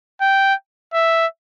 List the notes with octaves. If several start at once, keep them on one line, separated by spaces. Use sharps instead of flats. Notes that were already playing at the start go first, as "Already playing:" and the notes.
G5
E5